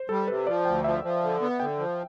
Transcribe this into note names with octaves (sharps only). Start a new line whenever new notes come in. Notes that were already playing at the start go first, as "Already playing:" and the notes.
Already playing: C5
G3 A4
C3 B4
F3 D5
D2 G5
F3 E5
F3
D3
B3
D3 G5
F3